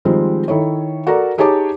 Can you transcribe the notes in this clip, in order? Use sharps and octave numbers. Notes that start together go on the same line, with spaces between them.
D#3 F3 G3 G#3 C4
D#3 E4 A4 C#5
F#4 A4 A#4 D5 A#5
D#4 G4 G#4 C#5 A5 D6